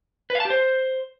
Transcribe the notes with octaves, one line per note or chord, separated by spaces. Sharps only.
B4
F5
A5
G4
C5